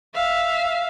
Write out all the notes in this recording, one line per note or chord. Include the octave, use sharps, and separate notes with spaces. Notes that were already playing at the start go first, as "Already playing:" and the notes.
E5 F5